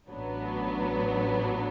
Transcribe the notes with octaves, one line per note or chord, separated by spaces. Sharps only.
A1 A2 F#3 B3 D4